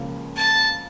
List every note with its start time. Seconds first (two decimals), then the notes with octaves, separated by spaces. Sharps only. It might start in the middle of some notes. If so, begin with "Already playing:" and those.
Already playing: C#2 C#3 F3 A#3 C#4
0.36 A5